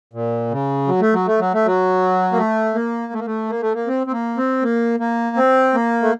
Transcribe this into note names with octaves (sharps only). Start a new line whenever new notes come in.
A#2
C#3
F#3
A3
F#3
A3
F#3
A3
F#3
A#3
A3
A#3
A3
A#3
A3
A#3
A3
A#3
C4
C4
A#3
C4
A#3
A#3
C4
A#3
A3